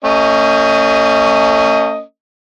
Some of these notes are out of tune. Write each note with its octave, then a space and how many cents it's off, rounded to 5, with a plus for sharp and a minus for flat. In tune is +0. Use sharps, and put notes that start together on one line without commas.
A3 +45 C#4 +0 D#5 +0